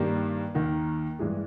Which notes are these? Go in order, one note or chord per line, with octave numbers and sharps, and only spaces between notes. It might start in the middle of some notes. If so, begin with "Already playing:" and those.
Already playing: G2 D#3 G3 A#3
D#2 D#3 A#3
G2 E3 G#3